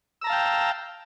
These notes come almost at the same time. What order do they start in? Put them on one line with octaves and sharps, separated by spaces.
E6 A#5 A5 F5 G5